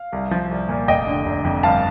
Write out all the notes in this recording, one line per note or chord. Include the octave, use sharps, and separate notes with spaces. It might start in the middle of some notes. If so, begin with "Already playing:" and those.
Already playing: F5
C2
F3
C2
A#2
F1 D#5 G5
D3
F1
F2
G1 F5 A5